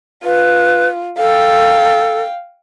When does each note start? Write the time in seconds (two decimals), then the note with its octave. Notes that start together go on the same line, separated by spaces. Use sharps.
0.24 F4 B4
1.18 A4 F5 G5